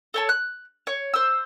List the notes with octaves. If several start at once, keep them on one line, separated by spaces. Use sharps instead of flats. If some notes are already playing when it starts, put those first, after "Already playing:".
A4 C#5 A5
F#6
C#5
C5 E6